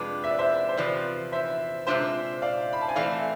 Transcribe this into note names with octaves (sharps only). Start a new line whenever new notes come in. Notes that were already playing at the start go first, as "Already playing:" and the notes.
Already playing: F2 C3 G#3 D4 F4 B4 D5
E5
D5
C5 E5
C5
E2 C3 F3 B4 D5
C5 E5
C3 G#3 D4 F4 C5 E5
D5 F5
B5
A5
G#5
E3 A3 C4 D5 F5